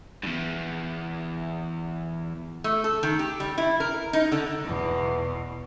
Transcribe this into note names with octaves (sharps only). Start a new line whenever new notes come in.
E2 G2
A3
A4
D#3
G4
G3
E4
A#4
D#4
D3
E2 B2